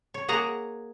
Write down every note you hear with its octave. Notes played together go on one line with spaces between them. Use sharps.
C#5
A#3 G#4 F#5 A#5